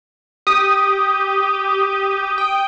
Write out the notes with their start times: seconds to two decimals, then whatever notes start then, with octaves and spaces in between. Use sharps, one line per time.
0.47 G4 D#6
2.38 G5